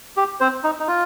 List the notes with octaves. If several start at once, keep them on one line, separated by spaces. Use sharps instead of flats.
G4
C4 C5
D#4
D#4
F4